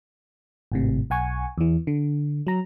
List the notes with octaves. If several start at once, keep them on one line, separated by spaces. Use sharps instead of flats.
G#1 A2 C3
B1 F#5 G#5 C#6
E2 E3
D3
F#3 A#5